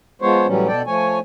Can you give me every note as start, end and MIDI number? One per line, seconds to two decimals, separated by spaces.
0.22 0.46 53
0.22 0.46 56
0.22 0.46 59
0.22 0.46 72
0.22 0.46 73
0.47 0.67 45
0.47 0.67 52
0.47 0.67 54
0.47 0.67 55
0.47 0.67 61
0.68 0.82 47
0.68 0.82 69
0.68 0.82 74
0.68 0.82 79
0.86 1.19 53
0.86 1.19 57
0.86 1.19 73
0.86 1.19 80